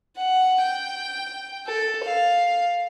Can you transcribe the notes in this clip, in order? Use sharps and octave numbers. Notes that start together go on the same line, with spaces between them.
F#5
G5
A4
F5